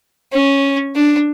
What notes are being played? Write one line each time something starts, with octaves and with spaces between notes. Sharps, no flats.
C#4
D4